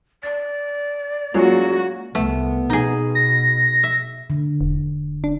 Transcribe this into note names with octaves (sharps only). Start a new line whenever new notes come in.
D5 A6
F#3 G#3 A#3 C#4 F4 F#4
C2 A3 B3
B2 D#4 G#4
A#6
E5
D3
E1
D4